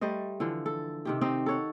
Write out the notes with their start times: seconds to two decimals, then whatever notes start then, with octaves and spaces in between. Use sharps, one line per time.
0.01 G3 A3 C5 D#5
0.40 D3 E3 F3
0.66 A4
1.05 C3 D#3 G4
1.21 C4 D#4 G4 D#5
1.46 A4 C#5 F#5